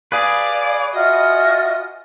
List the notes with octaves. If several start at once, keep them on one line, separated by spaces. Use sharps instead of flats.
G#4 B4 D5 F5
F4 F#4 D#5 E5 F6